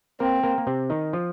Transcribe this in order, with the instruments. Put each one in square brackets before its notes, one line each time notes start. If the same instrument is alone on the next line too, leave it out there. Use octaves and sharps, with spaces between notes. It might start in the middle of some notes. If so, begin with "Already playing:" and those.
[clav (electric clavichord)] A#3 A#4 [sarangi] C4
[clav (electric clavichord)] A#3 A#4
A#3
C3 C4
D#3 D#4
F3 F4